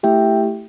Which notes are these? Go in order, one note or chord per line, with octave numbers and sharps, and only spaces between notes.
A3 E4 G4 E5 G5